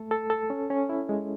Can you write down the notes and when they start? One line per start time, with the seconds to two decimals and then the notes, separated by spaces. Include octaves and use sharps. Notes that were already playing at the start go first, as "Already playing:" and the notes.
Already playing: A3 A4
0.11 A4
0.30 A4
0.50 C#4
0.70 C#4
0.89 E4
1.09 G#3